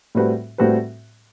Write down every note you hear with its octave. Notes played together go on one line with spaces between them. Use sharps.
A2 G3 C4 F#4 B4
A2 G3 C4 F#4 B4